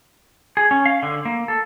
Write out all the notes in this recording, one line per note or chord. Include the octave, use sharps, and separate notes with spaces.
G#4
C#4
F5
D3
A#3
A4